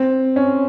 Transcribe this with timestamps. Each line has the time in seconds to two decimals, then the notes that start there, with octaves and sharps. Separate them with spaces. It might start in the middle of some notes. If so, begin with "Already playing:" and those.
Already playing: C4
0.36 C#4